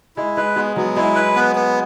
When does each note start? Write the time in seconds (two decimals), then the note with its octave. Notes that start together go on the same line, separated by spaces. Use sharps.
0.16 G#3 E4
0.37 G#3 B4
0.56 G#3 B3
0.76 F#3 B3
0.96 G#3 E4
1.16 B4
1.36 B3
1.56 B3